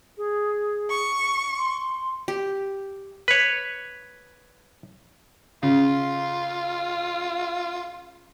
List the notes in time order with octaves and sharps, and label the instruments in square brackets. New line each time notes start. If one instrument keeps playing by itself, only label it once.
[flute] G#4
[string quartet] C#6
[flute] C6
[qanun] G4
[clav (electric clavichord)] B4 C#5
[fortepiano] C#3 [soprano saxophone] F4